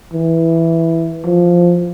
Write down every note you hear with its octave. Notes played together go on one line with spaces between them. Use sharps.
E3
F3